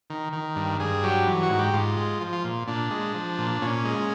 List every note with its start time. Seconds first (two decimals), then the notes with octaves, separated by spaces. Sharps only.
0.10 D#3
0.33 D#3
0.56 G2
0.80 G2 G#4
1.03 F#3 G4
1.27 E3
1.43 F#4
1.50 G#2
1.59 G4
1.74 G#2 F4
1.97 G#3
2.21 F3
2.33 F4
2.44 A#2
2.68 A#2 D4
2.91 G#3
3.15 F3
3.38 A#2
3.62 A#2 C#4
3.85 G#3